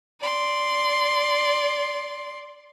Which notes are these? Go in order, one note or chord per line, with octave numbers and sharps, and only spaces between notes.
D5 C6